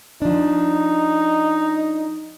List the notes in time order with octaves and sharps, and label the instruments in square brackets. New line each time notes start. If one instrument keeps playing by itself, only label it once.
[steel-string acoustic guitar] F3 D4 [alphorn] D#4